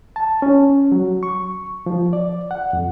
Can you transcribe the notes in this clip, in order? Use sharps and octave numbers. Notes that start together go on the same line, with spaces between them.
A5
C#4
F#3
C#6
F3
D5
F#5
F2